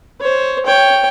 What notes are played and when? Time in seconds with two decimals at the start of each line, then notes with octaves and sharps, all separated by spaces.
0.20 C5 C#5
0.66 C#5 G5